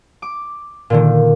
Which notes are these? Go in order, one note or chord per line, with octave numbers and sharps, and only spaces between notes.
D6
A#2 D3 D#3